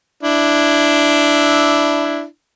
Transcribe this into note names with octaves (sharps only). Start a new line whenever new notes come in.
D4 E4